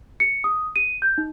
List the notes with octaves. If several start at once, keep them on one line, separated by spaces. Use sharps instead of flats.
C#7
D#6
D#7
G6
D#4